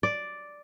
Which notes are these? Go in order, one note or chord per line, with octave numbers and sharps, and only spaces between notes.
D5